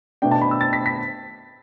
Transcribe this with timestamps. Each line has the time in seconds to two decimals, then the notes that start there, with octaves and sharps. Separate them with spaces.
0.22 B2 A3 D4 G5
0.31 A5
0.42 B5
0.51 E6
0.61 A6
0.73 B6
0.86 B6